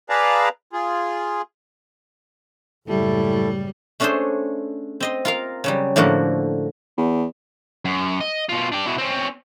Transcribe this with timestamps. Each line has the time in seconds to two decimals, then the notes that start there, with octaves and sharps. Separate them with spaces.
0.10 G#4 B4 D5 F5 A5 A#5
0.73 F4 G#4
2.88 F#1 A2 G3 A3 E4 A4
4.00 A3 C#4 D4 G#4 A4 C5
5.00 C4 D#5 C6
5.25 F4 A#4 F5
5.64 C#3 F#3 G3
5.96 A2 D3 F3 A#3 F#4
6.97 E2
7.85 F#2
8.21 D#5
8.49 B2 F4
8.72 D4 G4
8.86 B2 E4
8.98 C4 C#4